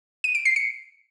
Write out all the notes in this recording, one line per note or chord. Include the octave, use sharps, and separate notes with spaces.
D#7
D7
C7
C#7